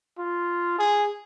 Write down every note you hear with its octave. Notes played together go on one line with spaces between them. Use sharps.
F4
G#4